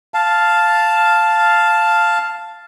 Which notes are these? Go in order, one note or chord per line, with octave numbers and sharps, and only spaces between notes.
F5 A5